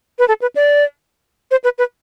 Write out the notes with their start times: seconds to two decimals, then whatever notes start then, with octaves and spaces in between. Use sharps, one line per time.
0.19 B4
0.28 A4
0.42 B4
0.56 D5
1.51 C5
1.64 B4
1.78 B4